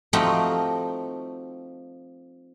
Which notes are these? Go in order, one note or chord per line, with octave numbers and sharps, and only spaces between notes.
F3 A3 C4 D#4 F#4 G4